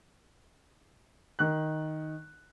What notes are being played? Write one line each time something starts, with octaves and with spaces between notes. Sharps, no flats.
D#3 F#6